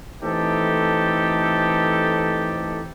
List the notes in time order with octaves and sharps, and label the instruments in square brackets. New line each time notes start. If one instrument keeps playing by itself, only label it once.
[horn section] E3 A3 C4 D#4 G4 A4